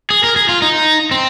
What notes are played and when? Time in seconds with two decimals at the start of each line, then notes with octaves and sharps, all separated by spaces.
0.10 G#4
0.24 A#4
0.36 G#4
0.49 F4
0.62 D#4
1.11 C4